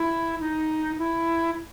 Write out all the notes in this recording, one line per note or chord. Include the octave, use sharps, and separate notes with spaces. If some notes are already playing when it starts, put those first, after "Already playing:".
Already playing: E4
D#4
E4